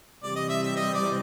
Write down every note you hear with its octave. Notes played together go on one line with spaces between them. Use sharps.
C3 E3 G3 D5
D#5
E5
E5
D#5
D5